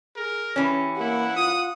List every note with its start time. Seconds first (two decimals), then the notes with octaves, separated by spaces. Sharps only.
0.16 G#4 A#4
0.56 E3 C#4 G4
1.00 A#3 E4 F#5
1.36 F4 D#6